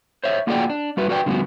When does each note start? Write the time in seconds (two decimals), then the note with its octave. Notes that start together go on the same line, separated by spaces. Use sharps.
0.24 C5 C#5 E5
0.47 A#3 F4 F#4 G#4 D5 G5
0.70 D4
0.97 G3 F#4 B4
1.09 F#4 B4 D5 F5 G5
1.26 D3 F3 G3 B3 F#4